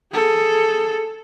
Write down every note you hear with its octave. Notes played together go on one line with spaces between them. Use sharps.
G#4 A4